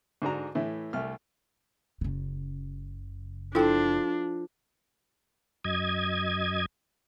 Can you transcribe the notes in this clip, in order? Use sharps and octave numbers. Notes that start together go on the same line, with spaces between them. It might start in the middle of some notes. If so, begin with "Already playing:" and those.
G#2 D3 D4 F#4 A#5
A2 E3 A3
C2 A3 F6
F#1 C#3
F3 D4 E4 A4 C5 G5
F#2 D#5 G#6